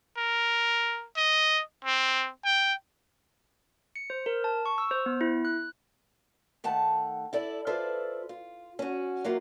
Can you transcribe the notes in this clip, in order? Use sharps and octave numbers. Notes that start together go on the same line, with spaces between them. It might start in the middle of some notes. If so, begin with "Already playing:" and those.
A#4
D#5
C4
G5
C#7
C5
A#4
A5
C#6
E6
C5
B3
E4
F#6
D#3 A3 F#5 A5
E4 A4 D5
F4 A4 B4 C5 D5 E5
F4
C#4 F#4
F#3 A#3 E4 F4